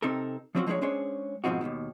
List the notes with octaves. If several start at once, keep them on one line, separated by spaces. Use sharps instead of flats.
C3 C4 D#4 A4 A#4
F3 F#3 C4 C#4 F4 F#4
F3 G#3 A#3 D4 G#4 C#5
G#3 C#4 D4 G#4 C5 C#5
G#2 B2 F3 C4 D#4 F#4
D#2 G#2 B2 D#3